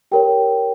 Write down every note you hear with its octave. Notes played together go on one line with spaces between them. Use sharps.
G4 A#4 C#5 G5